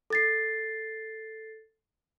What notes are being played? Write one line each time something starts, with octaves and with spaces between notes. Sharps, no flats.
A4 A6 C7